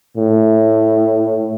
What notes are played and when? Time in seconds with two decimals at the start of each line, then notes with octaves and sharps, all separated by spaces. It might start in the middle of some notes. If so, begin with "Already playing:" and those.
0.17 A2